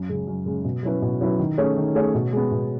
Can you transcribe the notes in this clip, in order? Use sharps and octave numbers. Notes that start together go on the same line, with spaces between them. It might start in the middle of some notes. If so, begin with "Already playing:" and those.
Already playing: F#2
C#3 G#3
F#2
C#3 G#3
B2
F#3 C#4 E4 B4
B2
F#3 C#4 E4 B4
D#3
A3 C#4 G#4 C#5
D#3
A3 C#4 G#4 C#5
B2
G#3 B3
B2